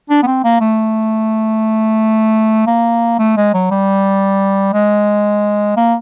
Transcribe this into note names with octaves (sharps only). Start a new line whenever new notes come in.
D4
B3
C4
A#3
A3
A#3
A3
G#3
F#3
G3
G#3
A#3